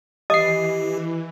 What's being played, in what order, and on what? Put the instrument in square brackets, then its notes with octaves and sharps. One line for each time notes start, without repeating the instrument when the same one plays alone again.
[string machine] E3 [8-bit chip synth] G4 [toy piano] D#5 [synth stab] D#6 C7